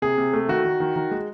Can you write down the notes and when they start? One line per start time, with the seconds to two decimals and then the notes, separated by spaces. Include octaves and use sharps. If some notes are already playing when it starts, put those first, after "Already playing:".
0.02 C3 G#4
0.18 C3
0.33 A3
0.48 D#3 F#4
0.64 D#3
0.80 D#3
0.96 D#3
1.11 G#3